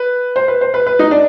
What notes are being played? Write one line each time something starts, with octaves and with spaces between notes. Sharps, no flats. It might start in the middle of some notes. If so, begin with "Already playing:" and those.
Already playing: B4
C5
B4
C5
B4
B4
D#4
D4